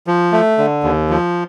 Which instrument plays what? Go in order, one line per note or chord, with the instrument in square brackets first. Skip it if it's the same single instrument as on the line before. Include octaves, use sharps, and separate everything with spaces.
[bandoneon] F3
A3
D3
D#2
F3